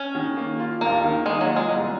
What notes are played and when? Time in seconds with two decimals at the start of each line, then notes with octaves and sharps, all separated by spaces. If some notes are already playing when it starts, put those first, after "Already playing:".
Already playing: C#4
0.15 D#3
0.37 A#3
0.60 F4
0.81 D#2 A#3
1.04 D#3
1.26 G#3 A#3
1.41 F#3
1.48 F4
1.56 G#3
1.70 C2